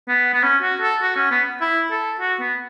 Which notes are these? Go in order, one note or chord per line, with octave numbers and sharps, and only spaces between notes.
B3
B3
C#4
F#4
A4
F#4
C#4
B3
E4
A4
F#4
B3